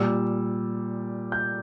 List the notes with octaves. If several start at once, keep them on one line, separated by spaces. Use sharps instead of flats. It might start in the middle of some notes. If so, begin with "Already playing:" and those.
Already playing: A#2 G3 E6
G6